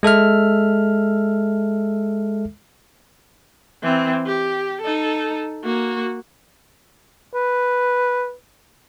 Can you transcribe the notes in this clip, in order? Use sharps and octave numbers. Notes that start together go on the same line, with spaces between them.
G#3 A4 E5 F6
E3 C4
G4
D#4 A4
A#3 F#4
B4